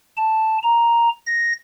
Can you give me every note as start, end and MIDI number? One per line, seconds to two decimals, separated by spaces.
0.17 0.58 81
0.63 1.09 82
1.26 1.53 94